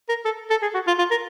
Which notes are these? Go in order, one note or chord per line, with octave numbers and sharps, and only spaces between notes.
A#4
A4
A4
G#4
F#4
F4
F4
A#4